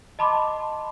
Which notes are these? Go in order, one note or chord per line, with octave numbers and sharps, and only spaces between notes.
D#5 A5 B5 C6 D6